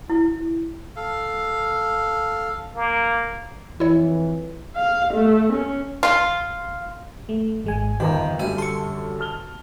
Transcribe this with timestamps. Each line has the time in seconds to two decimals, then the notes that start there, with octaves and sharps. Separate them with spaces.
0.10 E4
0.96 A4 F5
2.75 A#3
3.80 F2 E3 E4 C#5
4.75 F5
5.13 A3
5.52 C#4
6.03 F4 F5 C6
7.29 A3
7.64 G#1 G#3 G#5
8.00 G1 F2 D#3 G5 A#5
8.39 F#2 D3 G3 E5 G#5
8.58 A4 C6 C#6
9.19 A5 F6 G7